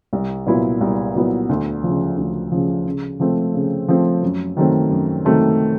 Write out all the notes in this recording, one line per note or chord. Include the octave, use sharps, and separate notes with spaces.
C2
A#2 F#3 B3 E4
C2
A#2 F#3 B3 E4
D2
C#3 F3
D2
C#3 F3
C#3
F3 A3 C4
C#3
F3 A3 C4
F#2
D#3 F#3 A3 C4
F#2
D#3 F#3 A3 C4